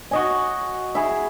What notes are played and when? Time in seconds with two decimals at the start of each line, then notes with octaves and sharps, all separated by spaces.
0.11 F#4 D#5 G#5
0.95 E4 G#4